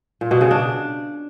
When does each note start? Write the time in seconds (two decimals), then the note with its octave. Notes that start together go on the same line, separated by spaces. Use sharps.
0.21 A#2
0.31 B2
0.41 C#3
0.51 D4